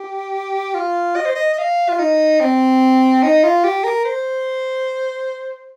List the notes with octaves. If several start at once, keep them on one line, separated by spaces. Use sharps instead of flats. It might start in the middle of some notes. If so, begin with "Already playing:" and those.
Already playing: G4
F4
D#5
C5
D#5
D#5
F5
F4
D#4
C4
D#4
F4
G4
A#4
C5